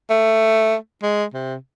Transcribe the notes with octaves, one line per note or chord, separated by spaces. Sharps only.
A3
G#3
C3